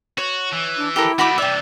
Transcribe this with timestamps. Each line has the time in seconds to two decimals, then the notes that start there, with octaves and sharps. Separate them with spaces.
0.18 F#4 C#5
0.52 E3
0.77 D4
0.96 E4 G4 A4 A#4
1.18 D#3 A3 F#4 B5 D6
1.38 C3 E3 D5 E5 G5